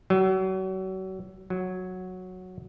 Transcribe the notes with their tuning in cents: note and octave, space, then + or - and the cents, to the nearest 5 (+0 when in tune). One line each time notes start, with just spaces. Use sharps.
F#3 +35
F#3 -5